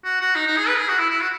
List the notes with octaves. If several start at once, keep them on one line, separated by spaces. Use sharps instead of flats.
F#4
F#4
D#4
D#4
G#4
B4
G#4
F#4
E4
E4
F#4